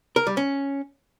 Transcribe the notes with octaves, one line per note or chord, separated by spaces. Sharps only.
A#4
G3
C#4